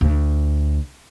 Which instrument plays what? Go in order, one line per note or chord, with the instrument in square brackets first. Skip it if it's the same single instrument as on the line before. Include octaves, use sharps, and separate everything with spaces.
[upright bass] D2